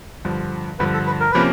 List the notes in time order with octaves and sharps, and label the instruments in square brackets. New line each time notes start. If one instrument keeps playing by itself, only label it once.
[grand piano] G2 D3 F3
[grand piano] G2 D3 F3 [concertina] B4
[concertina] A4
B4
A#4
[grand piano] C3 F3 A#3 C#4 [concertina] B4